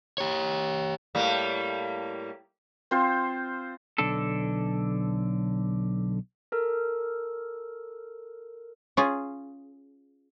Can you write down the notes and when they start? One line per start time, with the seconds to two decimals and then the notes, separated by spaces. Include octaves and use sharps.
0.18 G4 C#5
1.15 A2 G3 A#3
2.91 C4 F4 C5
3.98 B1 D3 D4 A4
6.52 A4 A#4
8.97 C#4 F4 G#4